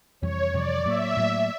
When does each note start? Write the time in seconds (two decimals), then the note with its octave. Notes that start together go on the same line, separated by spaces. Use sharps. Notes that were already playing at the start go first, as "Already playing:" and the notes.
0.21 F2 C3 E3 G3 C#5
0.53 F2 C3 E3 G3 D5
0.85 A2 F#3 A#3 E5
1.16 A2 F#3 A#3